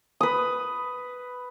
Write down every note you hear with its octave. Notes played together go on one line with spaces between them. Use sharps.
B4 D#6